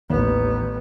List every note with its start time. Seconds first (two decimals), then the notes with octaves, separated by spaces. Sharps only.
0.10 A1 D#2 B3